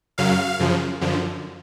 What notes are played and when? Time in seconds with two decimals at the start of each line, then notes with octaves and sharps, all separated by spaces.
0.18 F#2 C#3 F#3 F5
0.59 F#2 C#3 F3
1.01 F#2 D3 F3